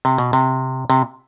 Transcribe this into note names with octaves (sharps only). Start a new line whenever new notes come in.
C3
B2
C3
C3